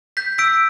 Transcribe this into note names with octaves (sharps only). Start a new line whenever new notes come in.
G6 B6
E6 B6 D7